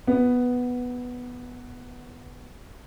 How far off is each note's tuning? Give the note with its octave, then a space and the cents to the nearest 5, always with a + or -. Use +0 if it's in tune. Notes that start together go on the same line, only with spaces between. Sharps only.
B3 +0 B4 -10